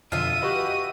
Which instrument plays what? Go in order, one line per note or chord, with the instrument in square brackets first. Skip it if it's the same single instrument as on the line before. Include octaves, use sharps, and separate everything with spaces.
[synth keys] F2 B2 D3 [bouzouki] F4 E5 [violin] D#6
[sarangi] F#4 [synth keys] G4 B4 D#5